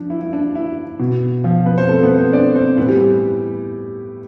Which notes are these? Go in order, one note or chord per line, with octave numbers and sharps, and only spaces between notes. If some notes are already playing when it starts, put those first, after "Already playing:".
Already playing: F3 D4
E4
E4
D4
E4
B2
F3 F4
B3 B4
C4 C5
A3 A4
B3 B4
C4 C5
D4 D5
C4 C5
A2 E3 B3 B4
G3 G4